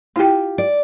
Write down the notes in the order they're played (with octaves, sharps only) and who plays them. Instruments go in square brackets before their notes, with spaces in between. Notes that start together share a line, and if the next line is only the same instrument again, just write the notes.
[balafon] E4 G5 [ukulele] F4 G4
[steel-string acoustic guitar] D5